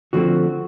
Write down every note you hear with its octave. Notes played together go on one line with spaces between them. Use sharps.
D3 F3 A3 C4 F#4